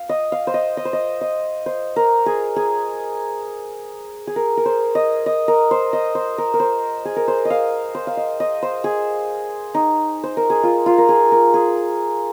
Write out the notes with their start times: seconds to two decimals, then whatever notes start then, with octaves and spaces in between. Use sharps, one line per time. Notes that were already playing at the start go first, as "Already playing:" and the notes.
Already playing: F5
0.09 D#5
0.32 F5
0.47 C5
0.54 D#5
0.77 D#5
0.85 C5
0.93 D#5
1.21 D#5
1.66 C5
1.96 A#4
2.26 G#4
2.56 G#4
4.27 G#4
4.36 A#4
4.57 A#4
4.65 C5
4.95 D#5
5.26 D#5
5.48 A#4
5.71 C5
5.93 D#5
6.15 C5
6.38 A#4
6.54 A#4
6.60 C5
7.05 G#4
7.16 A#4
7.28 C5
7.45 D#5
7.50 F5
7.95 C5
8.07 F5
8.17 D#5
8.40 D#5
8.62 C5
8.84 G#4
9.74 D#4
10.23 C5
10.37 A#4
10.50 G#4
10.63 F4
10.86 F4
10.98 A#4
11.09 G#4
11.32 A#4
11.54 G#4